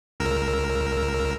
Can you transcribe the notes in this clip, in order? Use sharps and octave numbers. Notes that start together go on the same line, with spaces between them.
C#2 A#4 E6